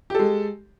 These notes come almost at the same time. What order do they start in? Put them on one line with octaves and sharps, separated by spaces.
G4 A4 G#3